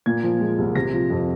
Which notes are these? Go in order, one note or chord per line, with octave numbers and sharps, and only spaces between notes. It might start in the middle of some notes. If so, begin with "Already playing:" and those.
A#2 G#6
F3
G#3
C2
C3 A#6
F3
F2